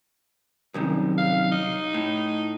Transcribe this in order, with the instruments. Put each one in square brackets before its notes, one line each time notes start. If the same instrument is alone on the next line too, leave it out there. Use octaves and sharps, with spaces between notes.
[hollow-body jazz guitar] C2 F#2 D#3
[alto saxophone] F5
D#4
[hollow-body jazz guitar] A2